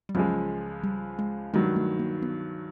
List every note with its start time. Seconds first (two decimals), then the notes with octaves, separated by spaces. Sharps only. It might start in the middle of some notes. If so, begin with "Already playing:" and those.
0.09 G3
0.15 C#2 C#3 F3 F#3 G#3
0.84 G3
1.19 G#3
1.54 G2 D#3 F#3 G#3
1.76 A3
1.99 A#3
2.22 B3